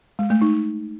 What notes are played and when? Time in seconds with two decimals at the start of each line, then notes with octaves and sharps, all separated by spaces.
0.19 G#3
0.30 A3
0.42 D#4